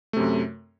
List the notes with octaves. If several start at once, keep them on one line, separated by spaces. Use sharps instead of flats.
F#2 C3 A3